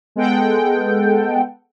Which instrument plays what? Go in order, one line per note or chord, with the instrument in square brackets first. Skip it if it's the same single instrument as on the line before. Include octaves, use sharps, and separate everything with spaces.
[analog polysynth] G#3 B3 A4 F#5 G5